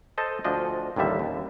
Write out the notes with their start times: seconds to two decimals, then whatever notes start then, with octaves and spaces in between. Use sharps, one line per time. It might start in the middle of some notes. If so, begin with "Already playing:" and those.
0.18 A4 C5 D#5 A5
0.45 D2 F3 D4 D#5
0.96 A1 D#2 D3 G3 E5
1.19 D#2